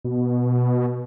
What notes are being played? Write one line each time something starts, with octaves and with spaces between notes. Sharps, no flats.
B2